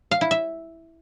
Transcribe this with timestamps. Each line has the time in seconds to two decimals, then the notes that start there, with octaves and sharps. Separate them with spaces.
0.11 F5
0.21 E4
0.31 E5